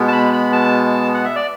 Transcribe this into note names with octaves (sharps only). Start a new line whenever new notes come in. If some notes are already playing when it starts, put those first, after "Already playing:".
Already playing: B2 G#3 B3
A5
B5
B5
A5
F#5
E5
D5